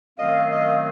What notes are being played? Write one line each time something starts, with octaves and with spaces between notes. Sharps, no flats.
F#2 D#3 F#3 A3 C4 D#5 F5
D#5 F5